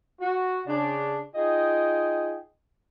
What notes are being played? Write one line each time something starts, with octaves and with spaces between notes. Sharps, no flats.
F#4
C#3 D4
D#4 F4 G#4 D#5 G5